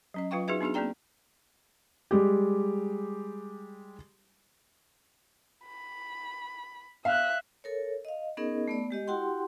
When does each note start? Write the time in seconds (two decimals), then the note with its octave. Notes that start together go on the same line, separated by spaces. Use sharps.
0.14 F#3 C#4 D#5
0.31 F#3 F4 B4 F5 G5 C#6
0.48 D#4 F#4 G#4 B4 E5
0.61 B3 D4 D#4 F#4 G#4
0.74 A#3 C4 G#4 D5 G5 A#5
2.11 G3 G#3 G4
5.65 B5
7.05 E5 F5 F#6
7.64 A4 A#4 C#5
8.05 D#5 F5
8.37 B3 C#4 D#4 G#4 A#4 D#5
8.68 A3 B3 D5
8.91 G#3 G4 D#5
9.08 E4 F#4 G4 F#5 G5 C6